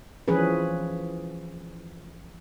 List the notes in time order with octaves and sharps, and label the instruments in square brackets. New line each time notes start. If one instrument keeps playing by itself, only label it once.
[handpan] E3 F3 C#4 G#4 B4